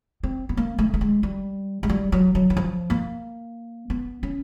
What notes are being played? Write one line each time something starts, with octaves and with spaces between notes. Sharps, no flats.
C4
B3
A#3
A3
A3
G#3
G3
G#3
G3
F#3
F#3
E3
F3
A#3
B3
C#4